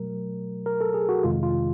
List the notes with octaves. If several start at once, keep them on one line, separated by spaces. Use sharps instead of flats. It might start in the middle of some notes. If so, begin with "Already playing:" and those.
Already playing: B2 F#3 A3 A#4
A#4
A4
G#4
F#4
F2 C3 D#3 G#3 F4
F4